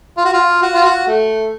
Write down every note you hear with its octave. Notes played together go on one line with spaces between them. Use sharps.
F4
F#4
F4
F#4
F4
F#4
A3